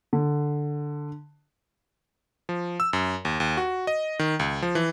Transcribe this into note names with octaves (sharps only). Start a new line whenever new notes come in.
D3
F3
E6
F#2
D#2
D#2
F#4
D#5
D#3
C#2
F3
E3